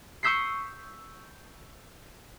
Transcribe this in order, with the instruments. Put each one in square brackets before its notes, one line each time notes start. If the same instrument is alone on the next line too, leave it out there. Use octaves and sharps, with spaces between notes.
[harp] C#6 D#6 E6 G6 B6 C7